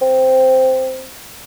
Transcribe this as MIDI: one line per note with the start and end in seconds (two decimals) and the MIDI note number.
0.02 1.08 60